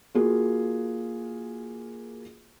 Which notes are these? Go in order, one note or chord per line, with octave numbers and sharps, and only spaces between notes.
A#3 F4 F#4 G#4